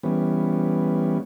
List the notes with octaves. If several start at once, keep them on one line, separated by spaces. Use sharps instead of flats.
E3 G3 B3 C#4